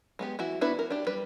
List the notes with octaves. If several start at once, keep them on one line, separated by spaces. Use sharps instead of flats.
G#3 B3 G4
E3 E4 F#4
B3 D4 E4 F#4 B4
A#4
D4 G4
G3 B4